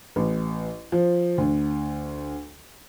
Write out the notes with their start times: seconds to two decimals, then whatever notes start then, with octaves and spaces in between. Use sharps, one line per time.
0.16 A1
0.92 F3
1.38 D2